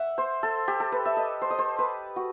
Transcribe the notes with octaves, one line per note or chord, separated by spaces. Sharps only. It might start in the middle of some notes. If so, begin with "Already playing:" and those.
Already playing: E5 F#5
C5
A4
G4
A4
B4
E5
D#5
C5
D#5
C5
B4
F#4